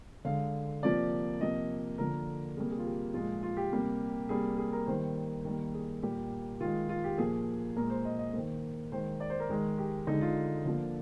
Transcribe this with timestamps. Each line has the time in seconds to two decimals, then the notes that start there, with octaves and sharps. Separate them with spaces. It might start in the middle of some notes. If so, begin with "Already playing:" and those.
0.25 D3 G#3 F5
0.82 C3 F3 A#3 D5
1.41 C3 F3 A#3 D#5
1.98 D3 F3 A#3 A#4
2.56 C3 G3 A#3 G#4
2.71 G#4
2.78 F4
2.85 G4
3.14 A#2 F3 G#3 F4
3.43 F4
3.57 G4
3.72 C3 G3 A#3
4.29 C3 G3 A#3 G#4
4.58 G#4
4.73 A#4
4.87 D#3 G3 A#3 C5
5.45 D#3 G3 A#3 A#4
5.74 G#4
6.02 A#2 G3 A#3 G4
6.61 D#3 G#3 F4
6.89 F4
7.04 G4
7.18 A#2 F3 A#3 G#4
7.76 A#2 G#3 A#4
7.90 C5
8.05 D#5
8.19 D#5
8.33 D#3 A#3 C5
8.92 D#3 G#3 C5
9.20 D5
9.30 C5
9.40 A#4
9.49 D#3 G#3
9.78 G4
10.07 D3 G#3 D#4
10.21 F4
10.65 D3 F3 A#3